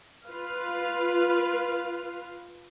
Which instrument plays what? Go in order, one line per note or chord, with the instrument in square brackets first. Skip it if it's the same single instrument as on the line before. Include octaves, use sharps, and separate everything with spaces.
[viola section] F4 B4 F5